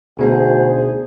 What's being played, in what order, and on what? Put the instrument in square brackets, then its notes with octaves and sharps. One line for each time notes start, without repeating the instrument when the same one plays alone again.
[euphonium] D2 [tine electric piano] B2 B3 D#4 [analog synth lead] G#4 [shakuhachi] C5